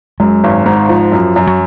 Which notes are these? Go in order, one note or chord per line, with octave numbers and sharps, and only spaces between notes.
F#2 G#3
G#1
G#2
F3
F#2
F#2
F#3